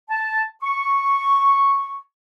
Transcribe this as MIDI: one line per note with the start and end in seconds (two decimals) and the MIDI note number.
0.10 0.43 81
0.63 1.98 85